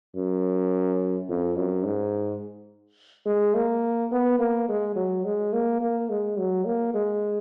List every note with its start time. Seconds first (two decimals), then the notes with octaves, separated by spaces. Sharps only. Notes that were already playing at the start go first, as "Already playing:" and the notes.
0.16 F#2
1.29 F2
1.56 F#2
1.85 G#2
3.26 G#3
3.55 A#3
4.11 B3
4.39 A#3
4.69 G#3
4.96 F#3
5.24 G#3
5.53 A#3
5.81 A#3
6.09 G#3
6.38 F#3
6.65 A#3
6.94 G#3